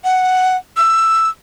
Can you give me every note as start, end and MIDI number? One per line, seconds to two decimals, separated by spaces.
0.04 0.57 78
0.77 1.29 88